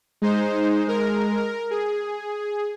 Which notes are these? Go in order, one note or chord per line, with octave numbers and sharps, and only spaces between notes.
G#3 D#4 C5
G#3 A#4
A#4
G#4